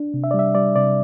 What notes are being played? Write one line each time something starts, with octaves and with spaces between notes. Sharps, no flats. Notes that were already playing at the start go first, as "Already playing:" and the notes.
Already playing: D4
C3
E5
D5
G3
E5
G3 D5
C3 D5